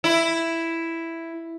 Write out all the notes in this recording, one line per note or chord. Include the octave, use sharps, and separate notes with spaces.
E4